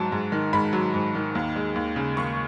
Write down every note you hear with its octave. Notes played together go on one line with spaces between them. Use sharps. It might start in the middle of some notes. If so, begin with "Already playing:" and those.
Already playing: G#2 F#3 A5
G#2
D#3
G#2 B5
F#3
G#2
D#3
D#2
G#3
D#2
C#3
D#2 C#6